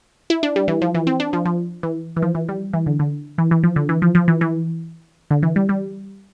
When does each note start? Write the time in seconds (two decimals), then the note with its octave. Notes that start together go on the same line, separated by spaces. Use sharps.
0.30 E4
0.43 D4
0.56 G3
0.68 E3
0.82 F3
0.95 E3
1.07 C4
1.20 D4
1.33 F3
1.45 F3
1.83 E3
2.16 E3
2.22 F3
2.35 E3
2.49 G3
2.73 E3
2.86 D3
3.00 D3
3.38 E3
3.51 E3
3.63 F3
3.76 D3
3.89 E3
4.02 F3
4.15 F3
4.28 E3
4.41 E3
5.31 D3
5.43 E3
5.56 G3
5.69 G3